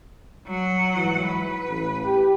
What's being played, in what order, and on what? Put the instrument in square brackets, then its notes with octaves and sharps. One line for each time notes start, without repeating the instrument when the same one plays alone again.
[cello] F#3 F#5
[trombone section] G#2 E3
[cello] B4
[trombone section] A1
G4